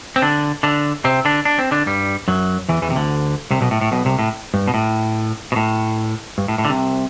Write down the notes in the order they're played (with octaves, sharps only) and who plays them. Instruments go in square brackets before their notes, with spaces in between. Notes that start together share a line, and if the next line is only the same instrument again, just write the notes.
[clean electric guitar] C4
D3 D4
D3 D4
C3 C4
D3 D4
D4
C4
D3 D4
G2 G3
F#2 F#3
E2 E3
E2 E3
C3
D2 D3
C2 C3
B1 B2
A2
A2
B1 B2
C2 C3
A2
G2
B2
A2
B2
A2
G2
A2
A2
D3
C2 C3